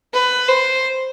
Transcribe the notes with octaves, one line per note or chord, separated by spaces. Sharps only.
B4
C5